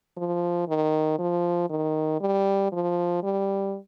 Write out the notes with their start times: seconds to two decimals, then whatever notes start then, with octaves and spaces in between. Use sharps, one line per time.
0.17 F3
0.68 D#3
1.19 F3
1.70 D#3
2.21 G3
2.72 F3
3.23 G3